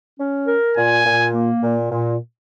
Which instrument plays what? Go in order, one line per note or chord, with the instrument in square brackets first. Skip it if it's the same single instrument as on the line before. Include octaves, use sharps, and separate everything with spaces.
[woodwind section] C#4
A#4
[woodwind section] A#2 [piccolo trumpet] G#5
[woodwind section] A#2
A#3
A#2
A#2